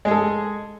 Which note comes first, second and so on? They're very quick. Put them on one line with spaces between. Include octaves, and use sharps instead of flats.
G#3 G#4 A4